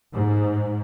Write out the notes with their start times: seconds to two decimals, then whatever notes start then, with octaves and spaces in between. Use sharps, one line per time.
0.12 G#2